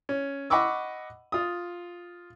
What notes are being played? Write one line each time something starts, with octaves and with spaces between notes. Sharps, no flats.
C#4
D#5 F#5 B5 C#6 D6 E6
F4 D#6